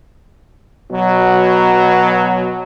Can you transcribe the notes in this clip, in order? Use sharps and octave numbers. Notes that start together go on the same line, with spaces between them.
B2 F#3